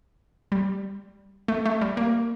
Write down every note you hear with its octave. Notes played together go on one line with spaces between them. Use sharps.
G3
A3
A3
G3
A#3